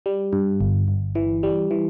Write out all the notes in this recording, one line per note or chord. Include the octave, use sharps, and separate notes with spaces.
G3
G2
G1
G1
E3
G3
E3